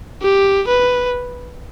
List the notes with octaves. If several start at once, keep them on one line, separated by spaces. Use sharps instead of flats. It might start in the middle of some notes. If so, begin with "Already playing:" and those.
G4
B4